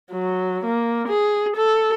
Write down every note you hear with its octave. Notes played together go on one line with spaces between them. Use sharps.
F#3
A#3
G#4
A4